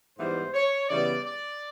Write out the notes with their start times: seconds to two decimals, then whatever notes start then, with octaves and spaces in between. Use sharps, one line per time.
0.18 G#2 E3 G3 B3 C5
0.54 C#5
0.89 C#3 E3 G3 B3 D5
1.25 D5